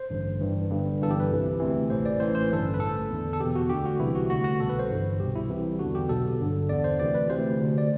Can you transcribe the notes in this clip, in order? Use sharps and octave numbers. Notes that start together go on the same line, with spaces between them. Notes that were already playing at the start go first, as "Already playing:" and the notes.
Already playing: C5
A1 G2 D3
G1 G2 E3
G1 G2 D3
G1 G2 E3 A4
G4
B4
C2 C3 E3
D2 C3 E3
A1 A2 E3 C5
D5
A1 A2 E3 C5
C5
B4
A1 G2 D3 A4
B4
B4
A1 A2 E3 A4
E2 D3
A4
E2 B2 G4
F#4
D2 D3 G4
F#4
C2 C3 E3 E4
F#4
D2 D3 F#4
F#4
C2 B2 A4
B4
C5
G1 G2 E3
C2 B2 G4
E4
C2 C3 E3
E2 D3 F#4
G4
B1 B2 A4
G1 G2 D3
E2 D3 D5
C5
D2 C3 E3 D5
B4
D2 C3 E3 C5
D2 D3
D5